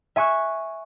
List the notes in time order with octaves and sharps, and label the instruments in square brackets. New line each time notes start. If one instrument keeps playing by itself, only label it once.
[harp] E5 G#5 C#6 F#6